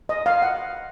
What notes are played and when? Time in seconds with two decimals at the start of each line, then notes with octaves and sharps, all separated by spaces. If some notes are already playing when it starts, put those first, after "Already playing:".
0.09 D#5
0.26 F5
0.42 F#5